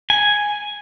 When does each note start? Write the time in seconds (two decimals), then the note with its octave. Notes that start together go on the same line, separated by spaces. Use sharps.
0.10 G#5